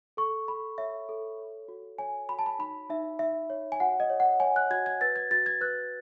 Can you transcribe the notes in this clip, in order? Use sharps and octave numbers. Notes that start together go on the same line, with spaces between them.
A4 C#6
A4 B5
C#5 E5
A4
C#5
F#4
C#5 G#5
F#4 B5
A5
B5
D#4 B5
D#4 E5
D#4 E5
C#5
G#5
F#4 F#5
D#5
C#5
F#5
C#5 G#5
F#6
F#4 G#6
G#6
B4 A6
G#6
F#4 A6
G#6
B4 F#6